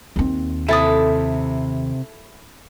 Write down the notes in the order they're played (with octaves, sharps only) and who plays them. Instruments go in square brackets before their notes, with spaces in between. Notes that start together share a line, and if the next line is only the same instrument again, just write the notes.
[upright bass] D#2 C4
[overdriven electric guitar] C3 [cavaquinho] E4 A5 D#6 [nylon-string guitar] A4